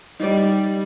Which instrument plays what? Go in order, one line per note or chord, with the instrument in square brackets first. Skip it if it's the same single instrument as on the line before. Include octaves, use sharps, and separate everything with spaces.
[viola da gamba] G3 [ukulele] D#4 D5